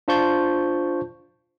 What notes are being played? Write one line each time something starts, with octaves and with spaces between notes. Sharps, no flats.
D4 F4 C5 A5 C#6 G6